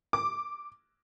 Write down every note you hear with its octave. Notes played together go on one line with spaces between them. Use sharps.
D6